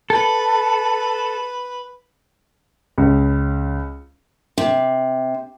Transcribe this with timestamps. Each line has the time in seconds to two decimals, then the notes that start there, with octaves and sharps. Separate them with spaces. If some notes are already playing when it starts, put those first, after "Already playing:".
0.10 A4 B4
2.98 C#2
4.58 C3